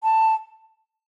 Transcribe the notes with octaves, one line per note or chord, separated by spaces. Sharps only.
A5